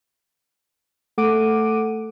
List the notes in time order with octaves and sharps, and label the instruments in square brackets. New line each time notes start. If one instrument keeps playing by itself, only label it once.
[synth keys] A3 A4 F#5 D6 D7 D#7